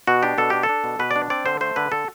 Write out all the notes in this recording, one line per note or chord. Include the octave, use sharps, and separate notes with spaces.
B2 F#4
D4 G4
B2 A4
D4 G4
A4
D4
B2
B2 B4
D5
D4
C4 D5
D3 C5
A3 C5
D3 B4
D3 A4